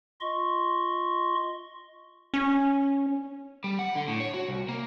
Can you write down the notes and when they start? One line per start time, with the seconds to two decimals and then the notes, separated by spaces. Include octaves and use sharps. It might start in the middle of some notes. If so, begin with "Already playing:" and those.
0.21 F4 D#5 C6 C#6
2.34 C#4
3.64 G3
3.79 F#5
3.95 D3
4.08 A2
4.20 C#5
4.34 F#4
4.48 C2
4.69 A#3